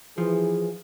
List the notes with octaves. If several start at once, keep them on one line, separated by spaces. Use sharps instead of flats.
E3 F3 G#4